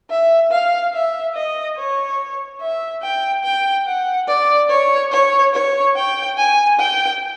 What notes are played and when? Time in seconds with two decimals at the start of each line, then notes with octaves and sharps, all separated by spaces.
0.10 E5
0.51 F5
0.93 E5
1.35 D#5
1.77 C#5
2.61 E5
3.03 G5
3.44 G5
3.86 F#5
4.28 D5
4.70 C#5
5.12 C#5
5.54 C#5
5.96 G5
6.38 G#5
6.79 G5